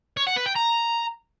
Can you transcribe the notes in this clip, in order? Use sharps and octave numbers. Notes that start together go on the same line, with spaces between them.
C#5
F#5
B4
G5
A#5